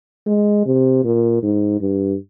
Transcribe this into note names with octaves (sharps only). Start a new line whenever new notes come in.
G#3
C3
A#2
G#2
G2